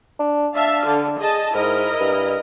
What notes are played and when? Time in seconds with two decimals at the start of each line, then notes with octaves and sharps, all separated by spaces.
0.19 D4
0.55 D4 E5 F5 A5
0.86 D3
1.20 G#4 D#5 A5
1.55 G#2 E4 A#4 D#5
2.00 G2